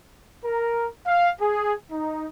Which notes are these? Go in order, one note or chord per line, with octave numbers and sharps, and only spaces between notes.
A#4
F5
G#4
D#4